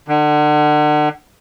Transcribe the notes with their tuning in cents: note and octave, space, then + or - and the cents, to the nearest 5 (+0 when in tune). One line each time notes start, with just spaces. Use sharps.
D3 +35